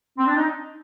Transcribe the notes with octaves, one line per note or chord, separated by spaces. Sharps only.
C4
D4
D#4